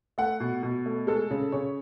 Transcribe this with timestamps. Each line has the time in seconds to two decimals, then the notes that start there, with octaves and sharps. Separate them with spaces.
0.18 A3 F#5
0.40 B2
0.63 B2
0.86 A3
1.07 G#3 A4
1.31 C#3
1.52 C#3 C#5